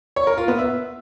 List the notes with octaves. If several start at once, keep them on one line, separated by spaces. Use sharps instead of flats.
C#5
A#4
F4
B3
E5